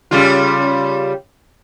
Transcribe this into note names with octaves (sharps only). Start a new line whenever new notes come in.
C#3 G3 F4